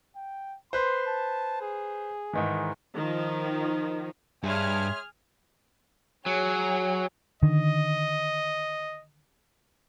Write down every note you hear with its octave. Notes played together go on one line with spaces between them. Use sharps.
G5
B4 C5 C6
A5
G#4
G#2 D#3 E3
D#3 F3
G2 G#4 C#5 E5 C6 F6
F#3 G#4 C#5
D3 D#3 D#5